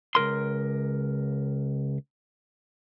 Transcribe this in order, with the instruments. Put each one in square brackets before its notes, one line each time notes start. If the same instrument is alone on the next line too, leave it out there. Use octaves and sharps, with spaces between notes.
[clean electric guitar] C#2 C3 A#4 C6